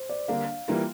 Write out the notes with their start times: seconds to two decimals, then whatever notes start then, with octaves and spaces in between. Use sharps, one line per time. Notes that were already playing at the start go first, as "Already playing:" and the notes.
Already playing: C5
0.09 D5
0.28 D3 G3 A#3 D4 F5
0.68 E3 G3 A#3 F4